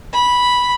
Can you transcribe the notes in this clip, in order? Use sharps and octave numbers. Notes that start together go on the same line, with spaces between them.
B5